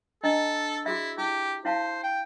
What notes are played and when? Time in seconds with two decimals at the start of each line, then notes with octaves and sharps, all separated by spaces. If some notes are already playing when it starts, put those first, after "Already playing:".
0.24 D4 A4 D#5 A#5
0.86 E4 F#4 G#4 E5
1.18 E4 G4
1.65 E4 C5 F5 A5
2.03 G5